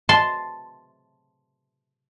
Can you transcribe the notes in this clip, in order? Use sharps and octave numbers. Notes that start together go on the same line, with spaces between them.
A5 C6